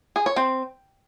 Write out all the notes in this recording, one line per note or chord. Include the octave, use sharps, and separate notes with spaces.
G#4
C#5
C4